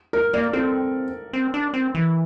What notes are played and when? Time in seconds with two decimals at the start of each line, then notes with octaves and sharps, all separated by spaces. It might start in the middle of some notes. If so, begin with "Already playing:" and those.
0.13 A#4
0.33 A#3 D5
0.53 C4 A4
1.33 C4
1.54 D4
1.74 C4
1.95 E3